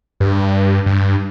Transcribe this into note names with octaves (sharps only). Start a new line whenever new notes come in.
G2
G2